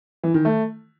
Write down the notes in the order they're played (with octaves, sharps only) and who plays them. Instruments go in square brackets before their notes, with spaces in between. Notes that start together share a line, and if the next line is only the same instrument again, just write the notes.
[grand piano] E3
D#3
A3